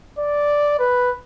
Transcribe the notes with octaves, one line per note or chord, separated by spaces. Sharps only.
D5
B4